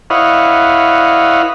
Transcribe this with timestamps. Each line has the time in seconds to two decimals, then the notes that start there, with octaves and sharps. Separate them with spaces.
0.10 E4 B4 C#5 D#5 F5 F#5